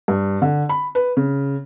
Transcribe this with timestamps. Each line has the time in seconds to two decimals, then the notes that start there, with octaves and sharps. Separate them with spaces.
0.08 G2
0.42 D3
0.69 B5
0.95 B4
1.17 C#3